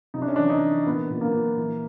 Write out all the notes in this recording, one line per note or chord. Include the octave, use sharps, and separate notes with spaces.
C3 D#4
D4
C#4
E3 D4
D#4
E3
A#2 B3
A#2
A#3
A#2
E3